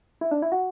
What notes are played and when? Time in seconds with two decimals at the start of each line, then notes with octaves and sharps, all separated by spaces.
0.21 E4
0.31 D4
0.42 E4
0.52 F#4